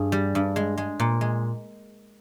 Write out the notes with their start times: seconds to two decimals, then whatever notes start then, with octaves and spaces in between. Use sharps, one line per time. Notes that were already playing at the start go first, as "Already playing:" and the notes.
Already playing: G2 G#4
0.12 G3
0.35 G2
0.56 G#3
0.78 G#3
1.00 A#2
1.21 G#3